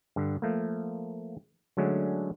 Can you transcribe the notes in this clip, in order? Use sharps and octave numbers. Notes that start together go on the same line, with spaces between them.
G2 D3
F3 A3 A#3
D3 F#3 G#3 A3 C#4 D4